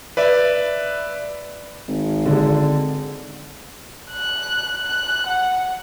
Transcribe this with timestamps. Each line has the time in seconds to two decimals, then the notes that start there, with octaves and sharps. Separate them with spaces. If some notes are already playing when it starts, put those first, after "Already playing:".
0.17 B4 D5 E5
1.88 G#1
2.25 D3 G#3 D4
4.12 F#6
4.82 F#6
5.27 F#5